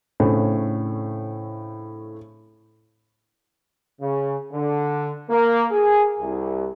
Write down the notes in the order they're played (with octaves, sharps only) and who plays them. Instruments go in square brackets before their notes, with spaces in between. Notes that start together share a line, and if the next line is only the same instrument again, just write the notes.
[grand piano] A2 C#3 A3 C4 D4
[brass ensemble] C#3
D3
A#3
G#4
C2